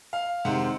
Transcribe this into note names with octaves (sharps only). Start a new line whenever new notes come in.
F5
C3 D#3 G#3 C4 F#5